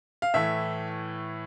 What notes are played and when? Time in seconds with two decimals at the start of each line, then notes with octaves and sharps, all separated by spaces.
0.22 F5
0.34 A2 E3 A3 E5